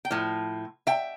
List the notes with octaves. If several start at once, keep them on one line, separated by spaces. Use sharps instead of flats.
G5
A2 F3
E5 G5